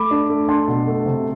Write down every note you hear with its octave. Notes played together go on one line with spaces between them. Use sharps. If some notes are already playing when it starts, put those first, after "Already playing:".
Already playing: A3 B5 D6
D4
A3
D4 A5 C6
B2
A3
C3